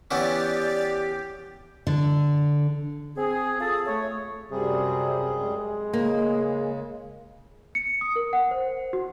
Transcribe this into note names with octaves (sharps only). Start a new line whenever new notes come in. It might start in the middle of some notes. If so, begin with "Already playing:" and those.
E3 B3 C#4 G4 D5 A6
D3
C4 G#4
F4 G#4 A4 A5 D#6
A3 C#5
F#2 C3 G3 G#4
G#3
C#3 A#3
C#7
D#6
A#4
F#5
C5
F#4